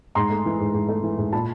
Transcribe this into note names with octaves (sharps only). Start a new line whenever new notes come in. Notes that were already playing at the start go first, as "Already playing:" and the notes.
G#2 A#5 C6
A3
E3
G#2
G#2
A3
E3
G#2
A#2 A5 B5